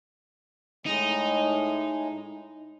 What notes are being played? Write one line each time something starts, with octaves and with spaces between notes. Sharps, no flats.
A2 G#3 D#4